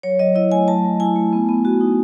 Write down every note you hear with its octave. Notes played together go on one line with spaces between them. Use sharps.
F#3 C#5
F#3 D#5
E4 D#5
A3 G#5
F#3 A5
F#3
E4 G#5
A3
B3
B3
F#4
D#4